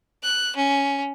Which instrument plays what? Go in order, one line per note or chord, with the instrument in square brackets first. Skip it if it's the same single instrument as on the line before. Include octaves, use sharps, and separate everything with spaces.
[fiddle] F#6
C#4